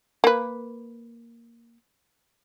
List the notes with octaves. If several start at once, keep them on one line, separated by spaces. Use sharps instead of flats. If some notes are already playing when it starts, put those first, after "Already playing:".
A#3 B4